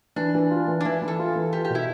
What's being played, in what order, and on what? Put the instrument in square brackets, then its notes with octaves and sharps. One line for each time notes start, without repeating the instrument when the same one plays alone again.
[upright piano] E3 [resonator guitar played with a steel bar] D4
[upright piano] E3
F4
E3
[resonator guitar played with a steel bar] D4
[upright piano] E3 [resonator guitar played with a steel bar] E4
[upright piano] E3
[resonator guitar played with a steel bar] A4
[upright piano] F4
E3
[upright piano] F4 [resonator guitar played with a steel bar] G4
[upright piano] B2 [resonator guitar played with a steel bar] G4
[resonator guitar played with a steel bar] E4